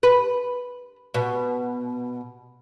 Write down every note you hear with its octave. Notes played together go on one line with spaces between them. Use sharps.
B4
B2